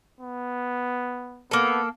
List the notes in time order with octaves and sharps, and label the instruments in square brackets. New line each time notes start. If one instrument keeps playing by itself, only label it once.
[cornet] B3
[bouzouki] A#3 A4 [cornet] B3